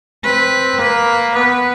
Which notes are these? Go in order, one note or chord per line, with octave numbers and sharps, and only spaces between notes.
C4 B4
A#3 B4
B3 B4